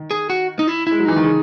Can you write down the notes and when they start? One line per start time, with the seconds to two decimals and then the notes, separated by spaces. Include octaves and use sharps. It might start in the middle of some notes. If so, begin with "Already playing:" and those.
Already playing: D#3
0.11 G#4
0.30 F#4
0.59 D#4
0.67 E4
0.87 G#3 E4
0.99 F#3
1.05 E3 D#4
1.16 D#3
1.24 C#3